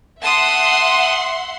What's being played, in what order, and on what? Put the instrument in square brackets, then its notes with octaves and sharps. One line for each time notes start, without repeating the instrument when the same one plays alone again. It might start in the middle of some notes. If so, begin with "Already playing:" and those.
[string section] E5 F#5 C6 [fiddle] A5 D#6